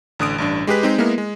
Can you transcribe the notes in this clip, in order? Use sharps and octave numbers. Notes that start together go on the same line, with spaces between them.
A1 D3 D#6 D7
A1 G2 D4
G#3 G4 G#4 B4 B6
G#3 C4 D#4
G#3 A#3 B3 E4 A#4
G#3